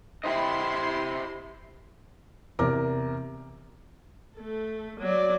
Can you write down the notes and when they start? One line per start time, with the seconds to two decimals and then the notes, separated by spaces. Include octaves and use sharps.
0.24 E4 G4 C5 D#5 C6
2.59 E2 C3 A#4 D6
4.36 A3 A4
5.00 F#3 D5